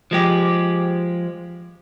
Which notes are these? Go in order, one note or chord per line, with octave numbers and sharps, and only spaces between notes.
F3 G#3 G4